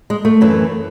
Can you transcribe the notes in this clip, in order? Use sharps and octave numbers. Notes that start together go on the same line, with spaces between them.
G#3
A3
F#2 E3